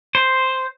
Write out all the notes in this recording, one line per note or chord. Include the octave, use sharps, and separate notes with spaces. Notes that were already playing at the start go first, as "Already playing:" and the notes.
C5